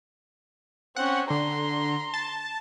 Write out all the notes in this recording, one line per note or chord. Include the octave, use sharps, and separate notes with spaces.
C4 C#4 F#5
D3 A#5 C6
A5